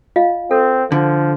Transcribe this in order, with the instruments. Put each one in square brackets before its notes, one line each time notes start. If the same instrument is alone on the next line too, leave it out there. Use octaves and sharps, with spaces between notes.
[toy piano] F4 D#5 F5
[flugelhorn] C4 [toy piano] A4
[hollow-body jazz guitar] D3 [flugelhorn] F3